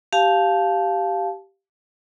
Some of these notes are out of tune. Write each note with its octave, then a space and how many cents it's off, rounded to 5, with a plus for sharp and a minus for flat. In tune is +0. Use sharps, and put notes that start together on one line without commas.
G4 -5 F5 +0 A5 -20